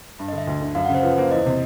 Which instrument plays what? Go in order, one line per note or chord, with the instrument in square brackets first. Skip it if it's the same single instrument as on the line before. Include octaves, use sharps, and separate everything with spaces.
[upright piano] G2
[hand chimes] D#5
[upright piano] D3
[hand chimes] E5
[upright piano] D2
D3
[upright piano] F#2 [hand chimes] F5
[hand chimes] F#5
[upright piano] C#3
[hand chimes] C5
[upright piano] F3 [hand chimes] B4
[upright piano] A#3 [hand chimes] C5
[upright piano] E2 [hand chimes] D#5
[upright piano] C3